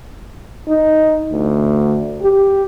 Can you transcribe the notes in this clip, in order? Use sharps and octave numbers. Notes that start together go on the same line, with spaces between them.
D#4
D2
G4